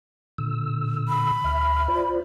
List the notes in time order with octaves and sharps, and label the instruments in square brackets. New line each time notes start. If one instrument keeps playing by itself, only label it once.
[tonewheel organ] A#2 D3 E6
[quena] B5
[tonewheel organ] D2 E5 F6
F4 C5 D5